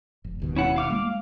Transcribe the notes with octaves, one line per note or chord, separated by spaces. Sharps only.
F1
E1 D#2 B2
C#4 E4 F#5
F5 D6 F6
G3 G#3 A#3